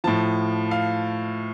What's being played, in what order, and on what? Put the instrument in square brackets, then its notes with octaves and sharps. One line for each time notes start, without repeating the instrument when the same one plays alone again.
[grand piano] A2 F3 A5
F5